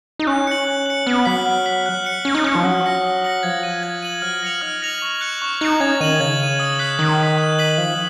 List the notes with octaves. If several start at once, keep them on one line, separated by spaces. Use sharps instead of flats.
D#4
C#4 F#6
C#7 F#7
F#6
C#7 F#7
B3 F6
F#3 B6 F#7
F6
B6 F#7
F#6
C#7 F#7
C#4 F#6
D#4
C#4 C#7 F#7
F3
F#3 D#6
A#6 C#7 F#7
D#6
A#6 C#7 F#7
F3 G#6
D#7 F#7
G#6
D#7 F#7
F#3 F6
F3 A#6 C#7 F7
D#4 F6
A#6 C#7 F7
C#6
F#6 C#7 F7
C#4 C#6
D#4 F#6 C#7 F7
C#4 G#6
D#3 D#7 F#7
C#3 G#6
D#7 F#7
D#6
F#6 B6
D#3 D#6
F#6 B6
F#6
B6 D#7 F#7
F3 F#6